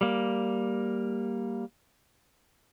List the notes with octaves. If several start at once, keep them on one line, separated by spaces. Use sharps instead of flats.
G3 A#3